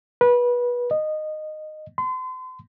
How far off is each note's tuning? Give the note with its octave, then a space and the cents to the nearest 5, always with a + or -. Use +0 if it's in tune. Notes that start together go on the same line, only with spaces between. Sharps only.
B4 -25
D#5 -15
C6 -35